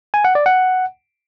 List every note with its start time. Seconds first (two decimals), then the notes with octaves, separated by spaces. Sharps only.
0.14 G#5
0.25 F#5
0.35 D5
0.46 F#5